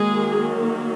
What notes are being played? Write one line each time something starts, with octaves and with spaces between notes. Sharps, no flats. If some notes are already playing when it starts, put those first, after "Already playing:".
Already playing: D#3 F#3 G#3 A#3 G#4